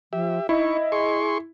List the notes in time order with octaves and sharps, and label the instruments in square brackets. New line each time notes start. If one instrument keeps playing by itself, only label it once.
[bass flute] F3 [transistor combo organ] G4 E5
[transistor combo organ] D#4 C#6 [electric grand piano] E4 [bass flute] D#5
[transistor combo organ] G#4 C6 C#6